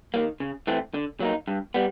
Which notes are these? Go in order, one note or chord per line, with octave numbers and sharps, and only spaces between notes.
D#3 F#3 A#3
C#3
E3 A3 C4
D3
F#3 A#3 D#4
G2
G3 B3